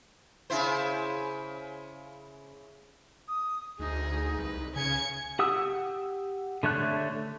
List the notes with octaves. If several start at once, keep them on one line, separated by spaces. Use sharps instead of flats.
C#3 E4 C5
D#6
D2 D#4 G#4
C2 B4
C#3 G#5 G#6 C#7
G4 F#5 D#6 E6
D3 A3 C#5 F#6